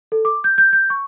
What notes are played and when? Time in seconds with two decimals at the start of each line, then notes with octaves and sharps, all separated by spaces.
0.12 A4
0.25 D6
0.44 G6
0.58 G6
0.73 G6
0.90 C#6